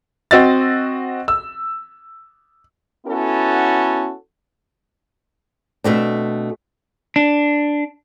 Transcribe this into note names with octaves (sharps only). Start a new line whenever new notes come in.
C4 F#4 D#5 E6 A6
E6
B3 C#4 E4 F#4 A4
B2 A3 C4 D4
D4